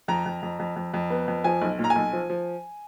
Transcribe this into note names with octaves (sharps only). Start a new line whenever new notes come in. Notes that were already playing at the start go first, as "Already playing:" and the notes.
F2 A#5
F2
F2
F2
F2
F2
B3
F2
F3 G#5
B1
A#2
A#5
G#5
B1
F3
F3